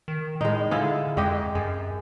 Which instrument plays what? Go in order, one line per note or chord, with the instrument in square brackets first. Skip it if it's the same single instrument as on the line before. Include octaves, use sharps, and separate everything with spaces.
[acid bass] D#3
[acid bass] A2 [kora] G#3 D#4
[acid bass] D3 [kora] E4 F4 G#4
[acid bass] F2 [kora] G#3 G4 D#5
[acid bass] F#2 [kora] G#4